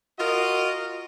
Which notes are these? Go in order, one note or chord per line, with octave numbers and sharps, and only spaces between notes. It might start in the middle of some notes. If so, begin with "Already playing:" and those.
F4 F#4 A#4 D#5